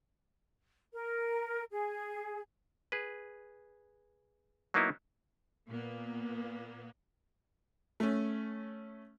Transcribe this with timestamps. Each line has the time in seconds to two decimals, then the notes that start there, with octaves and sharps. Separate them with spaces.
0.93 A#4
1.71 G#4
2.92 G#4 B4
4.74 F#3 A#3 B3 D#4 E4
5.68 A#2 A#3 B3
8.00 A3 C#4